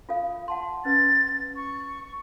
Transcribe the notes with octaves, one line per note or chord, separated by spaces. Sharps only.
F4 A4 F5
F#5 A5 C6
C#4 B4 A6
C#6